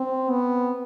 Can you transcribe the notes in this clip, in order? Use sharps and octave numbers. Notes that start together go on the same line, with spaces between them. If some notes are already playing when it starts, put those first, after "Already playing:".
Already playing: C4
B3